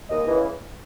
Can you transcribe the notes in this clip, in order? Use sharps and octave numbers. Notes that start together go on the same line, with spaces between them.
D#2 D#5
C#3 E3